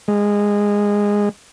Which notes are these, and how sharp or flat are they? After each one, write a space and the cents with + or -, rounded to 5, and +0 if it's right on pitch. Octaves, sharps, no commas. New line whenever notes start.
G#3 -15